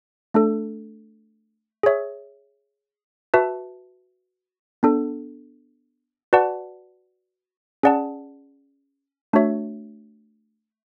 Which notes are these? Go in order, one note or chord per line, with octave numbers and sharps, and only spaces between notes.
A3 D4 A4
G#4 C#5 E5
F#4 B4 E5 A5
B3 D4 A4
F#4 B4 D5 F#5 A5
C#4 G#4 D5 F#5 A5
A3 D4 F#4 C#5 E5